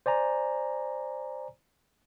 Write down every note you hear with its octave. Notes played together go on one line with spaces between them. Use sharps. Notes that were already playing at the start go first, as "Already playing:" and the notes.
C5 D5 G#5 A#5